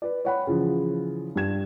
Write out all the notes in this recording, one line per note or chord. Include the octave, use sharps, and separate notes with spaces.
B4 D5
C#5 F#5 B5
C#3 E3 F3
G2 G4 G#6 E7